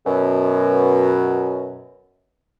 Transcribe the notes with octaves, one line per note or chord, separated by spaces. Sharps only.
F#2 B2